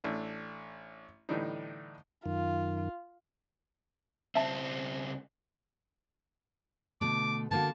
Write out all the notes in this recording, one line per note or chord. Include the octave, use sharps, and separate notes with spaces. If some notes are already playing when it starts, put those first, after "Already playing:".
A1 A3 D4
A2 D3 E3 G3 D4 D#4
F#2 D#3 F4
C#2 C4 E5 A5
B2 D3 A3 D6
D3 A#3 F#4 A5